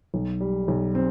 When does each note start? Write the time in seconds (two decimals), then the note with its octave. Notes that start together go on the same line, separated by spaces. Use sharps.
0.14 B1
0.40 G3
0.68 B1
0.95 C4